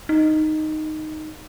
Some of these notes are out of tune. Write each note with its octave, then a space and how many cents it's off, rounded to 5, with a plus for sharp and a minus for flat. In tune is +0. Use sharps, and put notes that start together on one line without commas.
D#4 -5